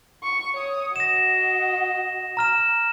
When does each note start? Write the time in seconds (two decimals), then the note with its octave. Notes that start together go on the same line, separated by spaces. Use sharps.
0.23 C#6
0.54 C#5 D#6
0.96 F#4 D#5 A#6 E7
2.37 A#5 F6 E7